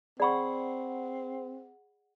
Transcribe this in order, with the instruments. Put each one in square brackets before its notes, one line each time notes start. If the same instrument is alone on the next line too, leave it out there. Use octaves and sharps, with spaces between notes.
[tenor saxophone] C4 [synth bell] G#4 F#5 [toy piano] D5 B5 C#6